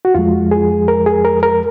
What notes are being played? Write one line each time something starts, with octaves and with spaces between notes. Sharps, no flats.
F#4
F2 F3 G#3 F4
G#4
A#4
G#4
A#4
A#4